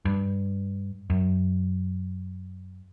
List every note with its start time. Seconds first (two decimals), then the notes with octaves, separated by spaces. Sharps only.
0.05 G2
1.10 F#2